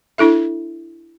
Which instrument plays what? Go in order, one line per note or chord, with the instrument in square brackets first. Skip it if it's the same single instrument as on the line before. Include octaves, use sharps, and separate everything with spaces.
[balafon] D4 E4 A4 E5